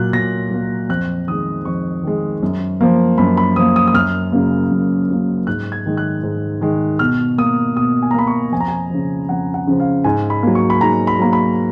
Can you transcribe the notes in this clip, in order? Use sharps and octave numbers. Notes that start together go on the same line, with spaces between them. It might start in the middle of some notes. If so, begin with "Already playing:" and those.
Already playing: A#2 F#3 A#3 F#6
A#2 A#6
F#3 A#3
F2 F#6
D#3 G#3 D#6
F2 C#6
D#3 G#3
F#2
F3 A#3
F#2 B5
B5
F3 A#3 D#6
D#6
D#6
F#2 F6
C#3 F#3 A#3
F#2
C#3 F#3 A#3
G#2 F#6
G#6
D#3 G#3
F#6
G#2
D#3 G#3
B2 F6
A#3 D#6
B2 D#6
G#5
A#5
A#3 B5
C#6
F2 G#5
A#5
G#5
C#3 F3
F2 F#5
F#5
C#3 F3
F5
G#2 G#5
B5
F#3 A#3
C#6
B5
G#2 A#5
B5
F#3 A#3 A#5
B5